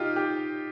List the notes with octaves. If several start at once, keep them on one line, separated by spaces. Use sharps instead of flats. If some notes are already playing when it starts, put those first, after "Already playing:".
Already playing: D#4 F4 G4
G4